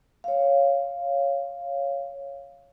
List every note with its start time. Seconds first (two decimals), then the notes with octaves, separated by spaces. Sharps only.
0.24 C#5 F5